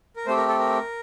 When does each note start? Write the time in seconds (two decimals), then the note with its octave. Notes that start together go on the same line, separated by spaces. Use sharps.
0.16 A#4
0.26 A3 C4 G4 C5
0.37 A#4
0.48 A4
0.59 A#4